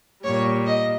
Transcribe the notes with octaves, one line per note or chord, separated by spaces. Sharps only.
A#2 G3 C#5
D#5